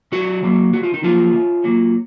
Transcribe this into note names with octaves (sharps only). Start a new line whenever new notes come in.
D#3 F#3 F#4
F#3 A#3
D#3 F#4
F4
D#4
F3 F#3 A#3 F4
D#3
F#3 A#3